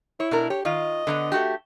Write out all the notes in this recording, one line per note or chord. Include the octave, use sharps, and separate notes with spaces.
E4 C#5
B2 D4 A#4
G4 C#5
D#3 F4 D#5
D3 A#3 B3
A3 F#4 G4